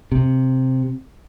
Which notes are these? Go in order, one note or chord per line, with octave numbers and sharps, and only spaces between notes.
C3